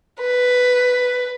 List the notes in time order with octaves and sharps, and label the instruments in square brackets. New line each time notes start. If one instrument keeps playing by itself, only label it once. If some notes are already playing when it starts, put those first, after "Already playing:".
[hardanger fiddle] B4